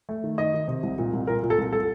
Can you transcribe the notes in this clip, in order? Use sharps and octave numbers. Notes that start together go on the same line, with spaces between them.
A3
D#3
D#3 D#5
D#3
C3
C2
A#2
C2
A#2 A#4
A#2
A4
C2
A4